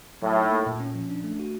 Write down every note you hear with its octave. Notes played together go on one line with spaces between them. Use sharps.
A2 F#3
D#4
A#3
A#2
C#4
F3
D4
A3
F#4